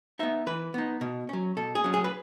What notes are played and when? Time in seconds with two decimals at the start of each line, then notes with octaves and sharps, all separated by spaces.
0.19 B3 D#4 E5
0.47 E3 B4
0.74 B3 D#4
1.01 B2
1.29 F#3 C#4
1.57 B2 A4
1.75 G#4
1.84 F#3 C#4
1.94 G#4
2.04 B4